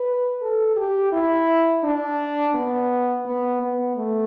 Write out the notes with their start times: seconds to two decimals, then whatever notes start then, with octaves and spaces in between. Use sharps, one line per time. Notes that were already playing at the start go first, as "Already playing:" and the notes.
Already playing: B4
0.42 A4
0.76 G4
1.12 E4
1.84 D4
2.54 B3
3.26 B3
3.62 B3
3.96 A3